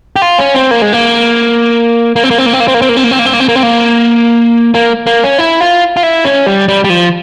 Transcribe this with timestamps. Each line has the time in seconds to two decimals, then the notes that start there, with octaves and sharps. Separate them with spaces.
0.16 G4
0.22 F4
0.39 C#4
0.54 C4
0.71 A#3
0.82 G#3
0.93 A#3
2.16 A#3
2.24 C4
2.31 A#3
2.38 C4
2.46 A#3
2.53 C4
2.60 A#3
2.68 C4
2.74 A#3
2.82 C4
2.89 A#3
2.97 C4
3.04 A#3
3.11 C4
3.19 A#3
3.26 C4
3.33 A#3
3.40 C4
3.48 A#3
3.56 C4
3.63 A#3
4.75 A#3
5.07 A#3
5.24 C#4
5.39 E4
5.61 F4
5.97 F4
6.03 E4
6.25 C#4
6.46 G3
6.68 G3
6.84 G3
6.90 F3